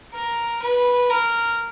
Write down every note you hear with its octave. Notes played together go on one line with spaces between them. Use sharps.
A#4
B4
A#4